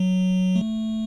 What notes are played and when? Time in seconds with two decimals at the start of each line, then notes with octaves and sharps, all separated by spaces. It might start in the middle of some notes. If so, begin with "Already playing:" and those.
Already playing: F#3
0.56 A3